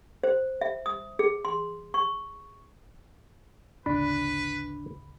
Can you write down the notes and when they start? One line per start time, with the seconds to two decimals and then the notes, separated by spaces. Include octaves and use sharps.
0.24 C5
0.61 E5
0.86 D#6
1.19 G#4
1.45 C6
1.94 C#6
3.86 G#1 D2 C#3 D4 B4 B5